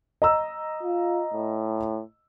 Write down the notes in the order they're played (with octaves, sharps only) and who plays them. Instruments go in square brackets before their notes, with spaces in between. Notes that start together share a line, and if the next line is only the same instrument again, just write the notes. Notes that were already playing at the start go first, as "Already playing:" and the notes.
[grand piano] D#5 A#5 E6
[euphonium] F4
A2